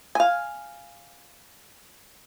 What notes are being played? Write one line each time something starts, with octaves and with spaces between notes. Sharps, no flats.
F5 G#5